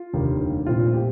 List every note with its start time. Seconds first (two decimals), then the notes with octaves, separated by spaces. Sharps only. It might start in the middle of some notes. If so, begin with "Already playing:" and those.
Already playing: F4
0.13 F1 D#2 D3 G3
0.67 A#1 A#2 A3 C4 F4
0.94 G4